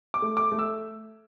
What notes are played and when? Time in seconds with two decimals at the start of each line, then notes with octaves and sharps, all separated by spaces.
0.14 D6
0.22 A3
0.37 D6
0.52 A3
0.59 E6